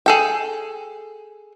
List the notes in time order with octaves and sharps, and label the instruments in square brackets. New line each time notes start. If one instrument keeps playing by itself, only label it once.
[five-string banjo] G#4 A4 G5